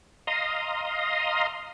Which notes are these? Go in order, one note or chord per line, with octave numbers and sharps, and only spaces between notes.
D#5 F5 A#5 C6 D#6